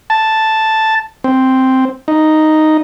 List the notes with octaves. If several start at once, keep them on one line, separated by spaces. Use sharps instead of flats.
A5
C4
D#4